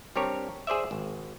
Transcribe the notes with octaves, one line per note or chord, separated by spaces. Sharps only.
G3 C4 D4 G4 A#4 C#5
G#4 C5 D5 E5
G#1